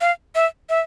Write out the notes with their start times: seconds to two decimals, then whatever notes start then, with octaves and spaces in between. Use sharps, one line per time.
0.01 F5
0.35 E5
0.69 E5